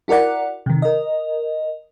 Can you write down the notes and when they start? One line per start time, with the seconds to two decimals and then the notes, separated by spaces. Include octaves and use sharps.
0.08 E4 F#4 A#4 D5 F#5
0.66 C3 D#3
0.82 A#4 D#5